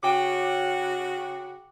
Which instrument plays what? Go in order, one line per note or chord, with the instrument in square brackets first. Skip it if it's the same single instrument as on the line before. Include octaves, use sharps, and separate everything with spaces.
[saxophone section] C#3 F#4 [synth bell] G5 D6